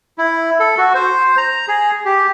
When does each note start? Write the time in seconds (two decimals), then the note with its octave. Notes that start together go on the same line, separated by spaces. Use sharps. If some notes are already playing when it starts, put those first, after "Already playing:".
0.18 E4
0.60 A4
0.78 F#4
0.94 C5
1.38 A#5
1.68 G#4
2.05 G4